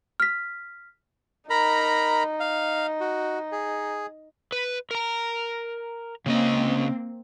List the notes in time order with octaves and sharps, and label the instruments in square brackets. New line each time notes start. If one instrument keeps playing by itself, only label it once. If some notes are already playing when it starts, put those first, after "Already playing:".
[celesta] F6 B6
[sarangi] D#4 [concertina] A#4 A#5 B5
[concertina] F5
F#4
G#4
[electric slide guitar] B4
A#4 A#5
[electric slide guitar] C#3 C#4 D#5 [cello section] A#3 C4